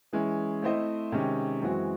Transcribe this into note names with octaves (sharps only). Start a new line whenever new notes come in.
E3 G#3 C#4 E4
A3 C4 E4 C5 D#5
C3 D#3 G#3 C#4
F#2 E3 G#3 C4 F#4